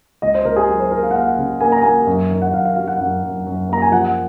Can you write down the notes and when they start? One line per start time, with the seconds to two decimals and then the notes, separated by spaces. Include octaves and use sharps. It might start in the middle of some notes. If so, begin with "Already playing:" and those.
0.22 C#2 D#5
0.35 C5
0.45 C#2 A#4
0.56 G#4
0.69 F#3
0.80 C5
0.91 A#3 A#4
1.03 F5
1.11 F#5
1.14 A#3 F5
1.38 C#3
1.61 A#3 G#5
1.72 A#5
1.82 A#3 G#5
2.07 F#2
2.31 D#3
2.42 F#5
2.53 F#2 F5
2.65 F5
2.76 F#3 F5
2.88 F#5
3.00 F#2
3.23 F#2
3.46 F#2
3.69 A#3 A#5
3.82 G#5
3.92 F3 F#5